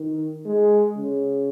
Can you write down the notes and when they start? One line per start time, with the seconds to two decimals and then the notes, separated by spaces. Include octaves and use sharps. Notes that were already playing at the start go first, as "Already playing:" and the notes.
Already playing: D#3
0.46 G#3
0.98 C#3